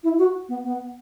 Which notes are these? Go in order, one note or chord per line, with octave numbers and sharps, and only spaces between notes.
E4
F#4
B3
B3